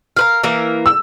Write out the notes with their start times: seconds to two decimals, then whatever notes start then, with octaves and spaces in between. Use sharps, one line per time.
0.17 A#4 B4 F5
0.44 E3 A#3 A#4
0.86 E6